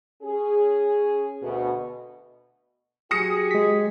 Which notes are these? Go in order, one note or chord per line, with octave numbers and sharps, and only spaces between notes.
C#4 G#4
D2 B2
F#3 G4 G#4 D#6 A#6 C#7
G#3 B6